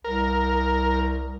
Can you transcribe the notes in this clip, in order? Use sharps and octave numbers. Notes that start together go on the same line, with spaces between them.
C2 A#4